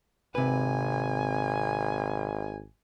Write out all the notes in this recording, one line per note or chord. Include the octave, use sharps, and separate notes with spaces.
G#1 C3 B4 G#5